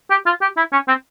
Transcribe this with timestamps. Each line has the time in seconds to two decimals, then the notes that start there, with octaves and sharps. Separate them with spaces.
0.10 G4
0.26 F4
0.41 G4
0.57 E4
0.72 C#4
0.88 C4